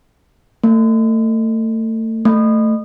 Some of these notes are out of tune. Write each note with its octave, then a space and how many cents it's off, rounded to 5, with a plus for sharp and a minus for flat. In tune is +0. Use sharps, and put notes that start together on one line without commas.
A3 +30
A3 +10